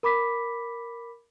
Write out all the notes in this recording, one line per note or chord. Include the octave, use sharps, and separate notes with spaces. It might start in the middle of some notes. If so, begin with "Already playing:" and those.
A#4 B5 D6 B6